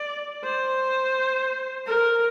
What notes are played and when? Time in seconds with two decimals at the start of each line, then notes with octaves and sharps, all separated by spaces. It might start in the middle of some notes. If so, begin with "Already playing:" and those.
Already playing: D5
0.44 C5
1.86 A#4